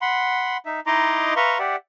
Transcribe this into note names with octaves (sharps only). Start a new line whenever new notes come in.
F#5 B5 C6
D#4 E5
D#4 E4 D#5 A#5 C6 D6
B4 E5 F5 A#5 C6 C#6
G4 D5 E5 F#5